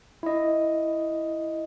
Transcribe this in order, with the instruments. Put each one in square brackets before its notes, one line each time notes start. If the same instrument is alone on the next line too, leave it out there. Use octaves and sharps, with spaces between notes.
[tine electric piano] E4 D#5